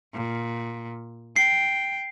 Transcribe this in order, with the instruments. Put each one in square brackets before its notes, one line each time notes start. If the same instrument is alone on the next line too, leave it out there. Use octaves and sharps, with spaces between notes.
[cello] A#2
[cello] G5 [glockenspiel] C7